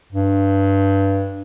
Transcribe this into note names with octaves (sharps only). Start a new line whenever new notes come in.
G2